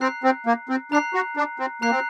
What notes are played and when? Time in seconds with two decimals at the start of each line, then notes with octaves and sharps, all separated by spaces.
0.01 C4 A#5 F#6 C7
0.24 C4
0.46 A#3
0.69 C4
0.92 D4 A#5 F#6 C7
1.14 F#4
1.37 D4
1.59 C4
1.82 A#3 A#5 F#6 C7
1.91 C4